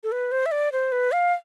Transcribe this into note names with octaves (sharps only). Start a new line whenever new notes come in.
A4
B4
C5
E5
D5
C5
B4
F5